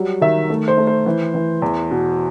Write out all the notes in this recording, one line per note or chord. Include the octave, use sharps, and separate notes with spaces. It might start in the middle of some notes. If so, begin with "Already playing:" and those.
Already playing: F#3 G3
D#3 E5
A3
C5
A3
C5
E3
E3
E2
B2